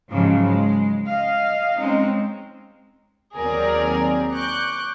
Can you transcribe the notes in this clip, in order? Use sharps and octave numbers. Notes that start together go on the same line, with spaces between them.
G#2 C#3 F3 F#3 G#3
G#3
D#5 F5
G#3 C4 C#4 D#4
D#2 F#3 C4 G#4 A#4 D5
C#6 D6 F#6 G6